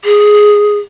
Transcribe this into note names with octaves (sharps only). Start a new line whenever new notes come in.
G#4